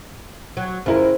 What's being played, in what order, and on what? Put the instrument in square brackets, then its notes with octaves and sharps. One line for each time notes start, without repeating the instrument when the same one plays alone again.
[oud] F#3
[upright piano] F#1 E4 A#4 [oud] F3